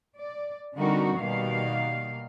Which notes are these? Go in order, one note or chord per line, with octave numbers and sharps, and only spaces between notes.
D5
D3 G3 C4 D#4 F#4 A#4
B2 D#3 G3 A#3 F5